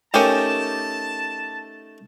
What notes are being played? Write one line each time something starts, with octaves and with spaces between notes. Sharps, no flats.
A3 C#4 D#4 G4 A#4 A5